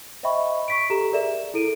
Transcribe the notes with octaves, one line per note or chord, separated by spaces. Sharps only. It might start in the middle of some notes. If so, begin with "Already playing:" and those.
C5 D#5 E5 G5 B5 C#6
C#6 B6 D7
G4 A4 A#5 E7
G#4 A#4 D5 E5 E7
E4 A4 D7 D#7